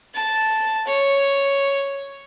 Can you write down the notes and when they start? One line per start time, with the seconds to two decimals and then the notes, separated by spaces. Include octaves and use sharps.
0.15 A5
0.87 C#5